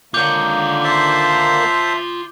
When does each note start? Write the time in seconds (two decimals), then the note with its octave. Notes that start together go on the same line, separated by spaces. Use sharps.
0.14 D3 D#3 A#3 F4 C#5 D6 G6
0.84 C5 E5 A5